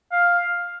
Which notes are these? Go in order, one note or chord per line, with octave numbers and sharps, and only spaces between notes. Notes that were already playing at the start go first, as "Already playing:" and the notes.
F5